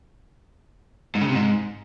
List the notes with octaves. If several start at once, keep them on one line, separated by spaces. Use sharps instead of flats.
G#2
C#3
C3
G#2